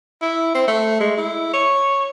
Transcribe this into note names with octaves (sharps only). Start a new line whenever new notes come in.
E4
C4
A3
G#3
E4
C#5